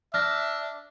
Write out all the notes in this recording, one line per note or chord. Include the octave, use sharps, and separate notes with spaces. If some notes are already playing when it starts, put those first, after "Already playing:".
D4 E5 F6 A#6